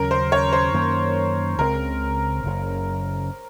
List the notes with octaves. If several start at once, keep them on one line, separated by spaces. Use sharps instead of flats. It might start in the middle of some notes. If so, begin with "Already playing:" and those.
Already playing: D#2 C#3 F#3 C#4 A#4
C5
C#5
C5
F#2 D#3 A#3 C#4
C#2 C#3 G#3 C4 A#4
F#1 F#2 C#3